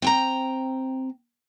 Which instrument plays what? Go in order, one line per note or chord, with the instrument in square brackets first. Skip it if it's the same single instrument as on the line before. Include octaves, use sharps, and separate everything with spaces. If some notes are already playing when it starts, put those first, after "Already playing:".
[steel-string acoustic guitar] C4 G5 A#5